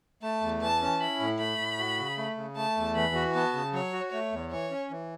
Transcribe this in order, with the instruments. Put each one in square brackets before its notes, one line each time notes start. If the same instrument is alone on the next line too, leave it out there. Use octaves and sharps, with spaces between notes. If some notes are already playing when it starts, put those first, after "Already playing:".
[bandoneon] A3 [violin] A5
[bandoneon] E2
[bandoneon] E3 [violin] A5
[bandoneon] C#4
[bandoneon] E4 [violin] B5
[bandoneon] A2
[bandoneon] A3 [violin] B5
[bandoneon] A2
F#4
C#3
A3
C#3
[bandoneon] A3 [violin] A5
[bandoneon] E2
[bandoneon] E3 [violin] B5
[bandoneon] F#4
[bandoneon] B3 [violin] A5
[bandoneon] C#3
[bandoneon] F#3 [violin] C#5
[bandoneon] F#4
[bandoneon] A3 [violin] C#5
[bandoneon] E2
[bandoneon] E3 [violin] C#5
[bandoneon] C#4
E3